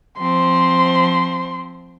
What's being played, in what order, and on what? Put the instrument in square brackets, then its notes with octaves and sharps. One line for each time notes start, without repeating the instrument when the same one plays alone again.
[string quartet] F3 C4 [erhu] C6